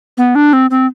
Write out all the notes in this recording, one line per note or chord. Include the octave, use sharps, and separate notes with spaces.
B3
D4
C4
C4